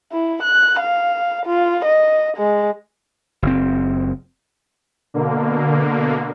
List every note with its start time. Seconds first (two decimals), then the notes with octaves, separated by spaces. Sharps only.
0.12 E4
0.43 F#6
0.80 F5
1.46 F4
1.85 D#5
2.37 G#3
3.42 F#1 C4
5.14 B2 D3 A#3